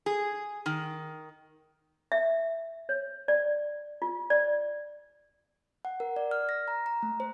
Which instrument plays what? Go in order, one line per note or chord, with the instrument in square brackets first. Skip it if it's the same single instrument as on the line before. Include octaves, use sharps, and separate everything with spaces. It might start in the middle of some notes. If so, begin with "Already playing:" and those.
[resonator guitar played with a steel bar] G#4
D#3
[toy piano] E5
C#5
D5
F4
D5
[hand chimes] F#5
A#4
D5
F6
A#6
A#5
A#5
A3
C5